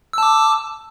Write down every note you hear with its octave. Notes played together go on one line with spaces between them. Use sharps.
A5 D6 E6